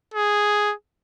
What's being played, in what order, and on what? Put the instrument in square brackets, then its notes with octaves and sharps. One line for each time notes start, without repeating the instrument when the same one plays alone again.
[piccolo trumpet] G#4